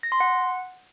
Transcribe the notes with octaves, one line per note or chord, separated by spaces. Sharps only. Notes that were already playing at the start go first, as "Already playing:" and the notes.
A#6
C6
F#5